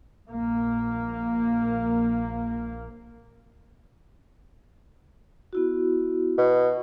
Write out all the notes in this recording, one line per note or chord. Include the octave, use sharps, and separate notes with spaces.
A#1 A#3
B3 E4 F#4
B2